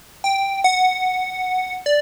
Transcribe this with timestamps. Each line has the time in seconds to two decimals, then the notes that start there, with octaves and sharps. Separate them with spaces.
0.24 G5
0.64 F#5
1.86 D5